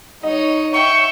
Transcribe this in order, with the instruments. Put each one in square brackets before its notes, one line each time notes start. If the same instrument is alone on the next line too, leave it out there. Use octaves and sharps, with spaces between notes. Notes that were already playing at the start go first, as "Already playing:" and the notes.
[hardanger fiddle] D#4 C#5 [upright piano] D#5
[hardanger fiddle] E5 G5 [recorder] C#6